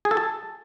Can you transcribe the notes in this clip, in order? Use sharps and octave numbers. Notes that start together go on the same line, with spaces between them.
G#4
A4
A5